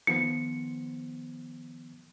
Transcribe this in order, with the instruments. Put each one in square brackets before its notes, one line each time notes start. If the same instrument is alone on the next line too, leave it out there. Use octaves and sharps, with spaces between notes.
[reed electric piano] D#3 F3 B3 [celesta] C#7